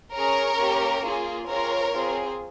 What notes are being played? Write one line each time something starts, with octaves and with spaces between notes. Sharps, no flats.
C#4 G#4 A#4 C#5
A#3 C#4 G4
A#3 F4 G#4
C4 F4 G#4 A#4 C#5
C4 F4 G#4